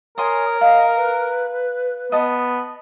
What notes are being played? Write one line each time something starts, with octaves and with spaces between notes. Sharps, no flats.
A#4 C#5 G#5 C6 D#6
D#5 F5
B4
B3 D#5 A5